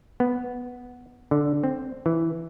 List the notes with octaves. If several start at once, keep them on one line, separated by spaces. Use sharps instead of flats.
B3
D3
C4
E3